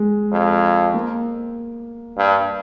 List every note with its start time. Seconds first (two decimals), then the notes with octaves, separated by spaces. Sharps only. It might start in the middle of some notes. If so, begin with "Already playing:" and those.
Already playing: G#3
0.32 F2
0.94 A#3
2.18 G2